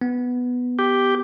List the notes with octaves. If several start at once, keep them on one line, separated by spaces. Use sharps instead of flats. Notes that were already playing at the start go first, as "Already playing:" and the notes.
B3
G4